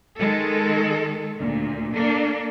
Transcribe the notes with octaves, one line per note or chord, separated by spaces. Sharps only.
D#3 G#3 A4
D2 A#2
A#3 D4 A4